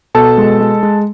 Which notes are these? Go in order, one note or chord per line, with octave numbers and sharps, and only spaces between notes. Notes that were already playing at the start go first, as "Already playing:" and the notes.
B2 A4 A5
G#3
G#3
G#3